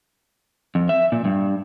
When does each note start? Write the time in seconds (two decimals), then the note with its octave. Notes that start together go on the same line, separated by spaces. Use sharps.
0.75 F2
0.89 E5
1.12 A#2
1.25 G2